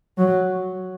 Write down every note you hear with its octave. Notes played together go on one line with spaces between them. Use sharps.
F#3